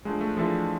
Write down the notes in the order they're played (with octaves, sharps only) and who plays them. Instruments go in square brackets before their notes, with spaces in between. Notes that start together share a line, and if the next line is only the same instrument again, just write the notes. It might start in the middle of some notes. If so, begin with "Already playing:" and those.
[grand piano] F3 A3 D4 [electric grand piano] G#3
[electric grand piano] A3
[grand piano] E3 G#3 D4 A4 E5 [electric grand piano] F3